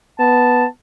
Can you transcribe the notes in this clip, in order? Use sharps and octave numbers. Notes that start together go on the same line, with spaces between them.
B3 A5